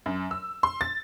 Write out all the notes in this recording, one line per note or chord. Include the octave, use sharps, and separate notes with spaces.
F#2
E6
C6
A6